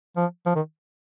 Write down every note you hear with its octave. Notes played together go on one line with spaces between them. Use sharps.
F3
F3
D#3